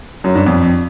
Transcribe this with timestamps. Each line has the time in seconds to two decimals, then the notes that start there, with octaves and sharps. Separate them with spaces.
0.24 F#2
0.35 G2
0.46 F2